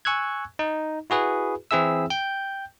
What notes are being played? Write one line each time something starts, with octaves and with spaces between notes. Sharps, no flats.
G#5 C#6 E6 F#6 G#6
D#4
E4 F#4 G#4 B4
E3 C4 E4 G#4 E5 E6
G5 G6